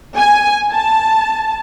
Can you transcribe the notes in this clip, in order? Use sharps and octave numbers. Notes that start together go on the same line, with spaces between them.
G#5
A5